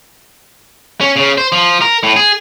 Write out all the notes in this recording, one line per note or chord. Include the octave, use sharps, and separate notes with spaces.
C#4
C#3
C5
F3
A#4
A2
G#4